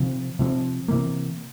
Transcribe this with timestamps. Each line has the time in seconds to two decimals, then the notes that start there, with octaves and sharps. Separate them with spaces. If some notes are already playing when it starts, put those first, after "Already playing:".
Already playing: C3 F3 C4
0.39 C3 F3 C4
0.88 C3 E3 A#3